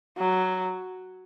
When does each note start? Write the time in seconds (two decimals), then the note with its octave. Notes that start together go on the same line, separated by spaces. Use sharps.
0.18 F#3